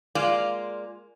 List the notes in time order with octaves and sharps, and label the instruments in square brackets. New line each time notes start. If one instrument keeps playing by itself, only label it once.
[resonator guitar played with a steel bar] G#3 A#3 F4 D5